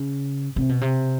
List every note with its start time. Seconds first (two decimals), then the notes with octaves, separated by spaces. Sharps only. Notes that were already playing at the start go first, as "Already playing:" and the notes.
Already playing: C#3
0.56 C3
0.69 B2
0.81 C3